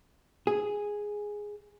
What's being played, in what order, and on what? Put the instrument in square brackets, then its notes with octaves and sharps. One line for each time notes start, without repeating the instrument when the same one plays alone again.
[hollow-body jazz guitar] G#4